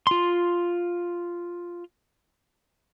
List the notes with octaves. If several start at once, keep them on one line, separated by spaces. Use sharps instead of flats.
F4 C6